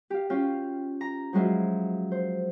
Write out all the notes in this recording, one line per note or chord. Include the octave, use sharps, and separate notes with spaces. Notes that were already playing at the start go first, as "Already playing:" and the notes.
G4 F5
C#4 F4 F5 G5
A#5
F3 F#3 G#3 E4 F4
C5